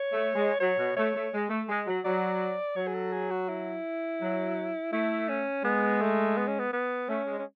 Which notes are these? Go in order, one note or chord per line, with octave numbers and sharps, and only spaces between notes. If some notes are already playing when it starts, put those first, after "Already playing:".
Already playing: C#5
A3
G#3
F#3 C#5
B2
A3 C#5
A3
G#3
A3
G#3
F#3
F#3 D5
F#3 C#5
G#4
A4
G#4
F#4
E4
F#3
A3 E4
C#4
G#3 B3
A3
B3
C#4
B3
B3
A3 C#4
G#3
C#4